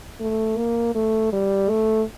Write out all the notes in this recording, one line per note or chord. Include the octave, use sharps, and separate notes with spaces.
A3
A#3
A3
G3
A3